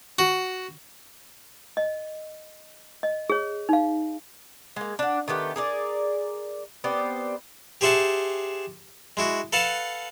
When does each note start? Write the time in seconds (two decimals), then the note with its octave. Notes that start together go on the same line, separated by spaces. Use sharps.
0.19 F#4
1.77 D#5
3.03 D#5
3.30 G#4 C#5
3.69 D#4 F5
4.76 G#3 A#3
4.99 D4 F#5
5.28 D#3 A3 B3 G4
5.56 G#4 A#4 D5
6.84 B3 C4 G4 D5
7.81 G4 G#4 C5 E5 F#5 A5
9.17 G#3 E4 F#4
9.53 A4 B4 F5 F#5 A5